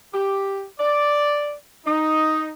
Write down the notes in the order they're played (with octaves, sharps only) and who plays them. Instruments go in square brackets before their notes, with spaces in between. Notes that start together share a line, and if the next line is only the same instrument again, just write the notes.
[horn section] G4
D5
D#4